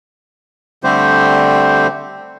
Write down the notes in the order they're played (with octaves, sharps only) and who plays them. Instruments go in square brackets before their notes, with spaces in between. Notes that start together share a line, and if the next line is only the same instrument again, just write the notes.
[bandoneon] D3 G3 A3 C4 G4 C5